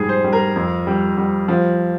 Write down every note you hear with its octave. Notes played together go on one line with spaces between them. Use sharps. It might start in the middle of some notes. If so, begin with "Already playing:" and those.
Already playing: F1 G#2 G3 G#4
C5
G3
A#4
F2
G3
G3
F3